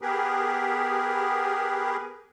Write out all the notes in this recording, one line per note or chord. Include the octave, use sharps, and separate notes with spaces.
B3 G4 G#4 A#4 B4